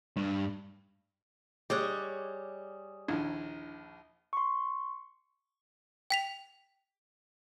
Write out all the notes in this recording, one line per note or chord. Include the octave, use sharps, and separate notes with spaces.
G2
G3 G#4 C#5 D#5 D6 D#6 F#6
A#1 D#2 D3 D4 E4 G#6
C6 C#6
G5 B6 F7